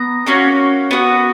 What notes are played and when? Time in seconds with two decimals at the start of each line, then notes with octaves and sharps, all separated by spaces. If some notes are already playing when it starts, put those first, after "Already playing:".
Already playing: B3 A#5
0.27 A#3 C#4 F#4
0.91 B3 F#4